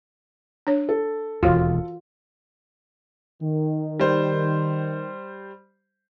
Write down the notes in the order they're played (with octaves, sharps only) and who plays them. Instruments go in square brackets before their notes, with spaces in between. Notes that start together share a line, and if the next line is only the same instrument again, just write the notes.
[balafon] D4 C#5
[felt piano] A4
[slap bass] E1 D#2 [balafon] E3 F#4 [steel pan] F4
[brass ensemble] D#3
[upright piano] G3 C5